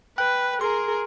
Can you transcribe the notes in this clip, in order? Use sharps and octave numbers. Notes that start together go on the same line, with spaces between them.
B4 G5 F#6
G#4 A#4 C6